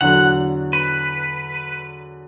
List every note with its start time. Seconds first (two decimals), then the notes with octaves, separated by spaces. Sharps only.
0.01 E2 D3 F#3 F#5
0.73 B4